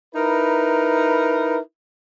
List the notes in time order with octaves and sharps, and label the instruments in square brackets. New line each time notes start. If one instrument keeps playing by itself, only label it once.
[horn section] D#4 E4 A#4 B4